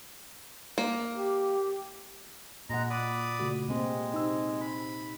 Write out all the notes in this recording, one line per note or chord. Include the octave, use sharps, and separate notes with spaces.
A#3
G4
A#2 G#3 F#5 A#5
D5 B5 D#6
C#3 A3 F#4
C3 G#3 A#3 C4
D#4 E6
B5